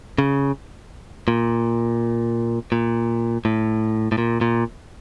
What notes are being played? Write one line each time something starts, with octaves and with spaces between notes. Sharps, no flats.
C#3
A#2
A#2
A2
A2
A#2
A#2